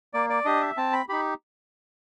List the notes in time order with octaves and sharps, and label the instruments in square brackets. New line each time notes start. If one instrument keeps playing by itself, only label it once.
[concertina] A#3 D5
D5
D4 G4 D#5
E5
C4 A5
B5
D#4 G4 B5